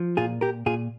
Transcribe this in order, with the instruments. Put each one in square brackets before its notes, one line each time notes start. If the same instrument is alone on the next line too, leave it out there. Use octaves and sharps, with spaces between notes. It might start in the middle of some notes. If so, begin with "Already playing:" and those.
Already playing: [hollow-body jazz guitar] F3
A#2 F4 G#4
A#2 G4 A#4
A#2 F4 G#4